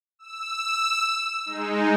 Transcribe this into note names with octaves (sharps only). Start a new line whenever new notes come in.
E6
G#3 D#4